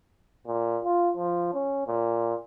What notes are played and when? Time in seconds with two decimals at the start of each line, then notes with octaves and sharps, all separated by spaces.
0.47 A#2
0.84 F4
1.17 F3
1.54 C#4
1.87 A#2